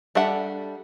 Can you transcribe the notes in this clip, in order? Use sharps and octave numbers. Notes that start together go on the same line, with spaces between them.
G3 D4 A4 E5 F#5